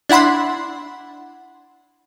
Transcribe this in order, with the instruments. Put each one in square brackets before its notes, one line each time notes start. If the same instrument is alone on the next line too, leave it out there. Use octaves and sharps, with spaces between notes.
[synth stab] D4 E4 F#5 B5 C6